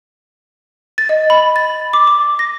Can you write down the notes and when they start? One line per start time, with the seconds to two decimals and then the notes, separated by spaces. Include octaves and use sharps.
0.98 A6
1.09 D#5
1.30 B5
1.56 A6
1.93 D6
2.07 D6
2.39 A#6